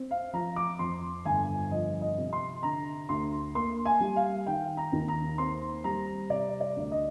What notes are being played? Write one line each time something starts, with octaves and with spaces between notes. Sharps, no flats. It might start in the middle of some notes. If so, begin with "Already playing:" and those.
Already playing: C4
F5
F3 A#5
D6
F2 C6
G1 G#5
F3 D#5
D#5
C3
C6
D3 A#5
D2 C6
A#3 C6
G#5
G3
F5
D#3 G5
A#5
D#2
A#5
C4 C6
G3 A#5
C3 D5
D5
D2
D#5